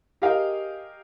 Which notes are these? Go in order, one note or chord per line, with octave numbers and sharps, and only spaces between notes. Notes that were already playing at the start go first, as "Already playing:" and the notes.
G4 G#4 A#4 D#5 F5 G5